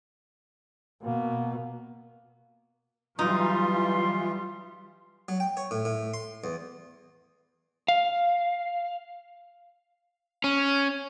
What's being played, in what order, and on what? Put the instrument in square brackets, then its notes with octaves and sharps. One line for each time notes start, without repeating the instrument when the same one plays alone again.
[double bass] B2 [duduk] A#3
[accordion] E3 F4 [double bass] F#3 G3 [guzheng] D#4 [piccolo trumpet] C6
[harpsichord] F#3
G5
C#5
A2
A2
C6
E2
[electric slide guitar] F5
[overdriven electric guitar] C#4